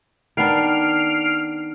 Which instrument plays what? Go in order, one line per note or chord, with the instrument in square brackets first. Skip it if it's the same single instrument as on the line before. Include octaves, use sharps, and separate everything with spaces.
[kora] D#3 B3 D4 [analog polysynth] F6 C7 D7